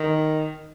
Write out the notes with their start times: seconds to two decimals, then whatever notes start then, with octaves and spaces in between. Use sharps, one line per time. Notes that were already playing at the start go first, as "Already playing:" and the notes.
Already playing: D#3